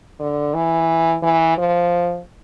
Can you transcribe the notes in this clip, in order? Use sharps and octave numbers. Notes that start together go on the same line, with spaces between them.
D3
E3
E3
F3